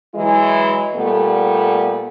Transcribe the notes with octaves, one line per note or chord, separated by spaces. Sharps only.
E3 F#3 G#3 E4
A#2 G3 A3 B3